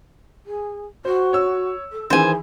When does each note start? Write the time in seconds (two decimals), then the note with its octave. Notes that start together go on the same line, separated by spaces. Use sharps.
0.46 G#4
1.05 F#4 C5
1.33 C#5 E6
1.92 A4
2.10 D#3 E3 G#4 C5 G#5